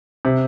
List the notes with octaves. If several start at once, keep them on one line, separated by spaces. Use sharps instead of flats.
C3